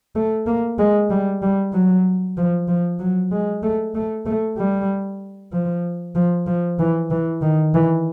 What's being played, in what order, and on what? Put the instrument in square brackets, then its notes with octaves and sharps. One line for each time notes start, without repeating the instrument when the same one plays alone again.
[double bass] A3
A#3
G#3
G3
G3
F#3
F3
F3
F#3
G#3
A3
A3
A3
G3
F3
F3
F3
E3
E3
D#3
E3